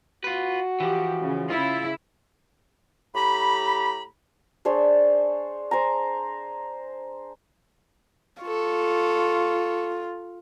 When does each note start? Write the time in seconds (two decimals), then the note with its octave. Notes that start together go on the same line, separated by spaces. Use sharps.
0.24 F4 F#4 B4
0.80 E3 F3 G4
1.19 C#3
1.50 C#3 E4 F4
3.15 A2 G4 A#5 B5
4.65 D4 G#4 C5 C#5
5.71 C5 G#5 A#5
8.42 F4 A4 C#6